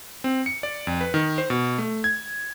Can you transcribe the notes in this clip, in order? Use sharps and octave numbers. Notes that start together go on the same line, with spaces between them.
C4
C#7
D5
F2
B4
D#3
C5
B2
A3
G#6